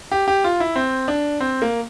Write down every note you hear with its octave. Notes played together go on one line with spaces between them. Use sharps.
G4
G4
F4
E4
C4
D4
C4
A#3